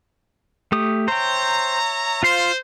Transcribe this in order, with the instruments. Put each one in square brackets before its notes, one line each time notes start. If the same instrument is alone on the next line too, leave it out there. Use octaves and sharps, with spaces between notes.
[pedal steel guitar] A3 G4 D#6
[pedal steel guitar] C5 G5 [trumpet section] C#5 E5 A#5
[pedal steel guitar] F4 F5 C6 [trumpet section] C5